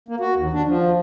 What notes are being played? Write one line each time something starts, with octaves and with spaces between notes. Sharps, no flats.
A#3
F#4
D#2
D4
F3